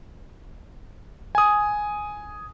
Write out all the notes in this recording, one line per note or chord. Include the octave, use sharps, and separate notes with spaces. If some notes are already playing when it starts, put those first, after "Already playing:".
G#5 D#6